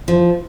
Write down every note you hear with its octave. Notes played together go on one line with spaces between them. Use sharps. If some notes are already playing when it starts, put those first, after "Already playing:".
F3